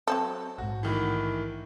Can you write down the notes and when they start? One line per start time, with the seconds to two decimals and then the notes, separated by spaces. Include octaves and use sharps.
0.08 F#3 C4 A4
0.58 A#1 G#2 F#4
0.83 A2 D#3 E3